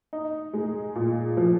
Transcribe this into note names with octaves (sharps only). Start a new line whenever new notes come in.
D#4
G#3
A#2
F3